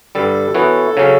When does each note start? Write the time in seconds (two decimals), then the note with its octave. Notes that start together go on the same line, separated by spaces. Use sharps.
0.15 G2 D3 G3 A4
0.54 E3 B3 F#4 A4 C#5
0.97 C#3 F#3 C#4